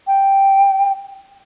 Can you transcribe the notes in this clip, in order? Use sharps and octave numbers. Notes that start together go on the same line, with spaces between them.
G5